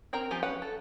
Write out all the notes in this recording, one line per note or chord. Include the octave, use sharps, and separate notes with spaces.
C4 A#4 G5 A#5
F3 G4 G#5
C#4 B4 F#5 G5
A4